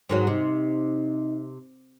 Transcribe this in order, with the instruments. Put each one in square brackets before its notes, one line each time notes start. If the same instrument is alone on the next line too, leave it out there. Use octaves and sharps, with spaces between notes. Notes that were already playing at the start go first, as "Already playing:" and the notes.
[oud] G#2 D#3 F#3
[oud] C3 [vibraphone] D#4 D#5